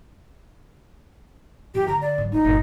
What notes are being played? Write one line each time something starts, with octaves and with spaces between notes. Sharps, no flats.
E2 G2 G4
D3 A#5
D5
G#2 F#3
A3 D#4 F4
G1 A#2